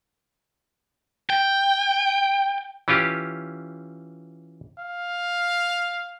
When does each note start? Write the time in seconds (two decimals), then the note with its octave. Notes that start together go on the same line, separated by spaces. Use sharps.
1.30 G5
2.88 E3 C#4 F4 G4
4.80 F5